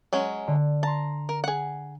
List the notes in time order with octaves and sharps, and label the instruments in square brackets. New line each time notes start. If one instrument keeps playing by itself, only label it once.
[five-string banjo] F#3 G#3 C#4
[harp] D3
[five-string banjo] A5 [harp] A#5 C6
[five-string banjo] A#4
G#4 F#5